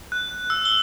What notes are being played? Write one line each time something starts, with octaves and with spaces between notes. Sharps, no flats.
F#6
E6
G7